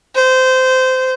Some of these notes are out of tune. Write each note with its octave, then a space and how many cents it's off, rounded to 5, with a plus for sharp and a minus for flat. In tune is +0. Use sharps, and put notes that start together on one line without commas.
C5 -20